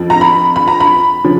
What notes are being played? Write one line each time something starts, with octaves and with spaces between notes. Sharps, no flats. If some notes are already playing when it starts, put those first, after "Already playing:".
Already playing: F2 F3
A#5
B5
B5
A#5
B5
C#3 F3